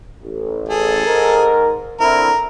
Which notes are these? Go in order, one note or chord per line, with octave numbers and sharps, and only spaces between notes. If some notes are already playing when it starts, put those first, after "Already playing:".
A1
G#4 A4
G#2 A#4
D3 C4 E4 A#4